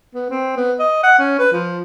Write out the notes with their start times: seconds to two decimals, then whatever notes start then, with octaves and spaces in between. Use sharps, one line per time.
0.15 B3
0.30 C4
0.57 B3
0.79 D#5
1.04 F#5
1.19 C#4
1.39 B4
1.52 F3